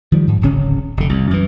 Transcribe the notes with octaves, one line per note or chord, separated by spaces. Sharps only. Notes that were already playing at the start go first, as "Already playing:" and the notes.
D#3 F3 G3
G#2
D1 G#1 C#3 C#4
F1 D3
C2
F#2 E3